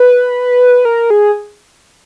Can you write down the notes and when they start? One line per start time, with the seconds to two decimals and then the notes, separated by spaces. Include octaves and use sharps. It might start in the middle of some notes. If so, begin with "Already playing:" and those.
Already playing: B4
0.85 A#4
1.10 G#4